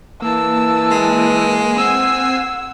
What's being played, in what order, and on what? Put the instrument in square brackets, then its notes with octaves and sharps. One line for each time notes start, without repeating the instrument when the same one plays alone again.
[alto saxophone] E3 [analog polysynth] A#3 [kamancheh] A5 E6
[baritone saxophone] G#3
[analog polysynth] C4 G#5 C7 [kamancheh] F#5 E6